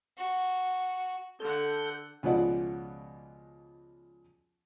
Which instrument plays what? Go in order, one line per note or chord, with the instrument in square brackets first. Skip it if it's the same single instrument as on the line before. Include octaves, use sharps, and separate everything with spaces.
[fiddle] F#4
[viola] D3 F#5 [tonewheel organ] A4 G6
[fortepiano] C#2 B2 F3 F4 D5 F#5